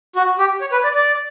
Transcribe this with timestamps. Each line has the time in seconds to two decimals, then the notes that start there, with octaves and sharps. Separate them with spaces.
0.16 F#4
0.39 G4
0.61 C#5
0.72 B4
0.83 D5
0.95 D5